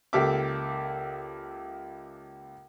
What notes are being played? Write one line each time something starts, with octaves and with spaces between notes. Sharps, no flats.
C#2 A#3 G4 A4 E5 D6